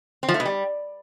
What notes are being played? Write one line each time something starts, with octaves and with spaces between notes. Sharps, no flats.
C4
F3
A3
B2
G3